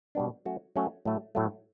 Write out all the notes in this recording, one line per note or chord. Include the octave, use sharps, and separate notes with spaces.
B2 G3 B3 D4
F#3 A3 C#4 F#4
F#3 A3 C#4 F#4
A2 F#3 A3
A2 F#3 A3